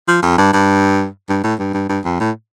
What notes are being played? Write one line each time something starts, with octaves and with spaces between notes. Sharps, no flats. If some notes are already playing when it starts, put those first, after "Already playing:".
F3
F2
G2
G2
G2
A2
G2
G2
G2
F2
A2